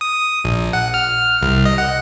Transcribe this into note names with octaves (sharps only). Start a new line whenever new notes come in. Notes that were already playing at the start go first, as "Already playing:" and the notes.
D#6
A#1
F#5
F6
C2
D#5
F#5